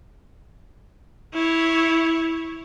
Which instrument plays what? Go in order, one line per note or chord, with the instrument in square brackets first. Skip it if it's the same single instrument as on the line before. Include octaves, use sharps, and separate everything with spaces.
[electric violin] E4 C#5